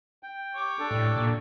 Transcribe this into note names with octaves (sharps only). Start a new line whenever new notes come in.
G5
G4 C#5 D6
D4 A4
A2
A#2